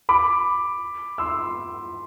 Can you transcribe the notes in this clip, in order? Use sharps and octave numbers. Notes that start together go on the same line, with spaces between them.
B5 D6
C6 E6